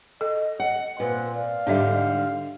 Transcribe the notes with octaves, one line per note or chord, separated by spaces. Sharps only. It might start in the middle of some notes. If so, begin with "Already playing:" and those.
A4 D#5
F#5
A#2 C4 B4
D5 F5
G#2 D3 G3 D4 E5